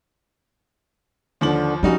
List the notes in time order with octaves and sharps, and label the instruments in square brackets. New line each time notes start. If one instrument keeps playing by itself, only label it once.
[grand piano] D#2 F3 F#7 [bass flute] D3
[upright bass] F3 [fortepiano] G3 D#4 F#4 [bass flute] C#4